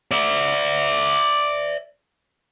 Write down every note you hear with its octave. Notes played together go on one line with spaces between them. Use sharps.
D5 E5